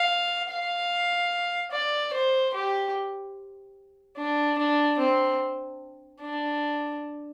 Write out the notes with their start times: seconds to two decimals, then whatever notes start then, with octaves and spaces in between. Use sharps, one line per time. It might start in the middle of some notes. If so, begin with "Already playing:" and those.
Already playing: F5
0.50 F5
1.72 D5
2.14 C5
2.54 G4
4.18 D4
4.58 D4
4.99 C4
6.21 D4